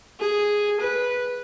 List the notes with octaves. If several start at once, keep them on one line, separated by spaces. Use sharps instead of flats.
G#4
B4